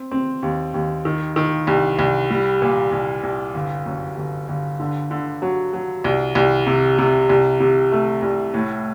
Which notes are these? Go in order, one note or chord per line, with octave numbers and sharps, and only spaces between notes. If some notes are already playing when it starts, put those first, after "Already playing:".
Already playing: C4
C4
D#2
D#2
D#3
D#3
C2
C2
G3
A#2
C2
C2
G1
F#2
G1
G1
D3
D3
F#3
F#3
C2
C2
C3
C3
C2
C3
A3
C2
A2